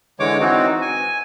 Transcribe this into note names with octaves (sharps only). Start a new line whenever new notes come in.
D3 E3 G#3 C#5 D6
E3 C4 D#4 F#4
G#5